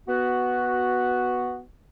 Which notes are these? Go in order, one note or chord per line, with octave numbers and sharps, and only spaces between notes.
B3 F#4